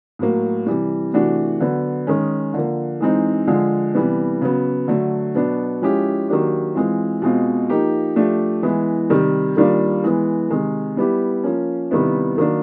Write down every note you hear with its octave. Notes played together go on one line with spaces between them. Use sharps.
A2 F#3 A#3
C3 E3 G3
C3 E3 A3 D4 F#4
D3 F#3 B3
D#3 G#3 C#4
D3 F3 A#3
E3 G#3 C4 D#4
D3 F3 G#3
C3 E3 G3 B3
C#3 F#3 B3
D3 F#3 A3
B2 F#3 B3 D4
F3 G#3 C#4 E4 G4
D#3 F#3 A#3 D4 G4
E3 G#3 C4 F4
B2 G#3 C4 F4
F3 A#3 D#4 G4
F3 A3 D4 G4
E3 G#3 B3 E4
C3 D#3 G3
D#3 G3 A#3 D4 F4
E3 G#3 B3
C3 D#3 G#3
G3 B3 E4 G4
F3 A#3 C#4
C3 D#3 G3 B3 E4
D#3 F#3 A#3 D4